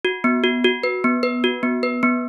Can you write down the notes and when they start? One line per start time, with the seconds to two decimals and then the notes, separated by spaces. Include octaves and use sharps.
0.05 F#4
0.24 B3
0.44 F#4
0.64 F#4
0.84 B4
1.04 B3
1.23 B4
1.44 F#4
1.63 B3
1.83 B4
2.03 B3